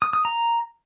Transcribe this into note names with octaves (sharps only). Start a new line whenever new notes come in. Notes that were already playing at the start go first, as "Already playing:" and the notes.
D#6
D#6
A#5